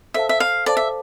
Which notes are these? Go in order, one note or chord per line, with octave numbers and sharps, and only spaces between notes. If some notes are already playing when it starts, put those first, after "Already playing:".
A4 C5 E5 F5 A5
E5
F5
A4 C5 D5 F5 A5
E5